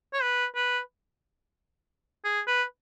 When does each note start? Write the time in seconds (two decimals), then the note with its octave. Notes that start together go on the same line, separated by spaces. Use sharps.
0.13 C#5
0.22 B4
0.55 B4
2.24 G#4
2.47 B4